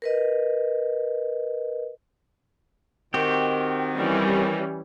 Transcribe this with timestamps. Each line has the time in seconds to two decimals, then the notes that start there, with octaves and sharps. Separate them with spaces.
0.02 A#4 B4 D#5
3.14 D#3 C4 F#4 G4
3.97 E3 G3 C#4